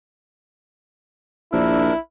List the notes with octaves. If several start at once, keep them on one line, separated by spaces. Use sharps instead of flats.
A#1 D4 E4 A#4 E6